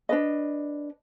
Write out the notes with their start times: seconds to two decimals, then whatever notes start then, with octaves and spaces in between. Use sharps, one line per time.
0.09 D4 B4 D#5